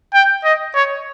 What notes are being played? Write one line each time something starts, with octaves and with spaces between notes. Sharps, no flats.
G5
D#5
C#5